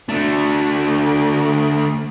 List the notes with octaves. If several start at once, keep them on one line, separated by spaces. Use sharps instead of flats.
D3 A3